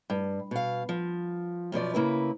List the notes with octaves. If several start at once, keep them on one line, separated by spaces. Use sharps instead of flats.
G2
B2 F5
F3
F#2 B2 F3 D5
C#3 A#3 E4 B4